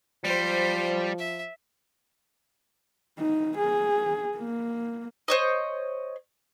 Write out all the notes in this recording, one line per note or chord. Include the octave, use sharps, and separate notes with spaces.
F3 G3 C5
E5
D#4
G#4
A#3
C5 C#5 D#5